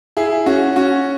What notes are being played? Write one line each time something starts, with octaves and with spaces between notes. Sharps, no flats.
E4 G#4
C#4 F#4
C#4 F#4